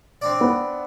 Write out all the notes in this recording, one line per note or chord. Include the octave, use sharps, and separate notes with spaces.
C4 D4 D5
B3